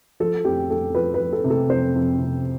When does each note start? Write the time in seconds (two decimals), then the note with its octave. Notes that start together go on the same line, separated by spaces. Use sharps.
0.20 F3 A4
0.45 F2 G4
0.70 F2 A4
0.95 F3 B4
1.14 B4
1.20 F3
1.33 A4
1.44 C3
1.50 A4
1.70 F2 C5
1.95 F2
2.19 C3